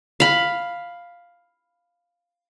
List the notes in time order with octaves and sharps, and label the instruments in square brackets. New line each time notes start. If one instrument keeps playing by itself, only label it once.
[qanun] F5 B5